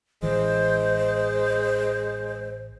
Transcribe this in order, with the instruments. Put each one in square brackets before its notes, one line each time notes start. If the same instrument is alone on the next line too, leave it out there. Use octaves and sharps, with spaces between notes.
[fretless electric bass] A1 E3 [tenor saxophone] G#3 [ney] C5